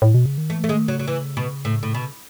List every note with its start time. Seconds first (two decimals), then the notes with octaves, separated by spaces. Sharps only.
0.02 A2
0.14 B2
0.26 C#3
0.38 D#3
0.49 E3 A3
0.64 A3
0.69 D#3 G#3
0.88 C#3 F#3
0.99 F#3
1.08 E3
1.37 B2
1.65 A2
1.83 A2
1.95 B2